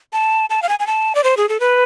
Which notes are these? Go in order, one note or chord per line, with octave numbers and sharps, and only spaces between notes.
A5
A5
F5
G#5
G#5
A5
D5
C5
G#4
A4
B4